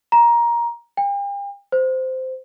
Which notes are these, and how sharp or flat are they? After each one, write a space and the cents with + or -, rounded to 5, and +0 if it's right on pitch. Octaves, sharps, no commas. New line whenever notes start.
A#5 +15
G5 +40
C5 -10